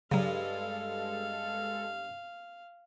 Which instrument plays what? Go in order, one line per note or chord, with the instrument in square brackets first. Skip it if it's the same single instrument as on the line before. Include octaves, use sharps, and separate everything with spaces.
[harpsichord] G2 [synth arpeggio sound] C#3 F#3 [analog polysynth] G#3 A4 [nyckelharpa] F5